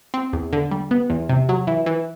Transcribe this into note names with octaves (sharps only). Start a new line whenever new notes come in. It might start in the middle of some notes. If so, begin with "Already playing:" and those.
C4
E2
D3
G3
B3
E2
C3
F#3
E3
E3